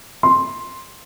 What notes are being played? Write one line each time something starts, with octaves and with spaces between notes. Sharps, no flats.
C6